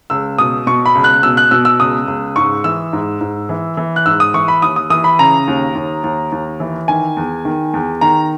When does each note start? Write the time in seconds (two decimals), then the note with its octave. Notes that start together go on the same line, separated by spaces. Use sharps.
0.10 C#2 E6
0.38 B2 D#6
0.67 B2 C#6
0.86 B5
0.95 C#2
1.04 F#6
1.23 B2 E6
1.37 F#6
1.51 B2 E6
1.65 E6
1.80 C#2 D#6
2.08 C#2
2.36 G#2 C#6
2.64 E3 E6
2.93 G#2
3.21 G#2
3.49 E3
3.77 E3
3.96 F#6
4.06 G#2 E6
4.20 D#6
4.34 E3 C#6
4.48 B5
4.62 D#2 D#6
4.76 D#6
4.90 E3 D#6
5.04 B5
5.19 C#3 A#5
5.48 D#2
5.75 D#2
6.04 D#2
6.32 D#2
6.60 E3
6.88 D#3 G#5
7.17 E2
7.45 D#3
7.74 E2
8.01 D#3 A#5